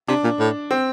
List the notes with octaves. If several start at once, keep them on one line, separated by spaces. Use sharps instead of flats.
C3 D4
A#2
A2
C4